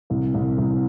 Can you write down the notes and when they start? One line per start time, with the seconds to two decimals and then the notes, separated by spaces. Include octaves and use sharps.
0.10 C2
0.34 C2
0.58 C2